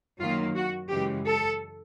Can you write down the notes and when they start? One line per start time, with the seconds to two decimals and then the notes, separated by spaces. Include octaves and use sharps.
0.19 F#2 D#3 F#3 A#3 F4
0.55 F#4
0.90 F#2 C#3 E3 G#3 G4
1.26 A4